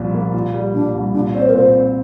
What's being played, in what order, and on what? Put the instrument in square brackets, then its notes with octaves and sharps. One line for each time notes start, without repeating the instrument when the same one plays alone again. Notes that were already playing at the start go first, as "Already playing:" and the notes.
Already playing: [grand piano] C2 A#2 F3 G3
A#3
A#2
G3
[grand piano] A#2 [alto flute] D4
[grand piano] C2
[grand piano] A#2 [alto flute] D4
[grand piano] C4 [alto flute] D5
[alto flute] C5
A#4
[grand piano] A#2 [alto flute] C5
[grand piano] C4